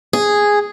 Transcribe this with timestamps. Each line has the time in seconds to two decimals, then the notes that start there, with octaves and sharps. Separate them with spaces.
0.13 G#4